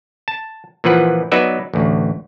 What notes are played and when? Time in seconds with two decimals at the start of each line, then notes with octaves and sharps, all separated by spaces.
0.28 A5
0.84 A#2 E3 F3 B4 F#5
1.32 F#3 B3 D#4 B4 D5 E5
1.74 A1 D2